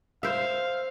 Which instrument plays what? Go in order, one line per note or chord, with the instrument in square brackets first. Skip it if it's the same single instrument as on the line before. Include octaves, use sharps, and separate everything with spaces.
[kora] C5 E5 [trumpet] F5